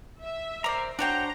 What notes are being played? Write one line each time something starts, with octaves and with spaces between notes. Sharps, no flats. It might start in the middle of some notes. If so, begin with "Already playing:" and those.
E5
A#4 C5 D5 A#5
D4 F#4 C5 C#5 G5 A#5